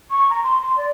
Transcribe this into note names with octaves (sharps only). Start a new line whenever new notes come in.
C#6
A#5
C6
C6
D5